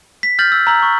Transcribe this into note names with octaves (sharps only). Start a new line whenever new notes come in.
B6
F6 G6 A6 F#7
E6
A#5 E6 F#7
C#6